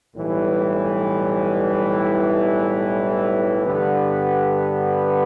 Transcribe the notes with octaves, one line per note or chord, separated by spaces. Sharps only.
B1 A2 E3 G3
G2 D3 B3 G4 B4